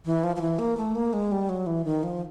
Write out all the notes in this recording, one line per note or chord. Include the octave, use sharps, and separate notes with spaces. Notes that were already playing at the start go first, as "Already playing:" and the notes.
E3
F3
F3
E3
A#3
A3
A#3
G#3
G3
F#3
E3
D#3
F3